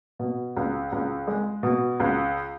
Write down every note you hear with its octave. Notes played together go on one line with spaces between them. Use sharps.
B2
C#2
C#2
G#3
B2
C#2